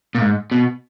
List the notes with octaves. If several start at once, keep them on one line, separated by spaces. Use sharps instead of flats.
A#2
G#2
B2